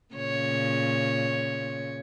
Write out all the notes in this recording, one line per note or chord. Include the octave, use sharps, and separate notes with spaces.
A#2 C#3 C#5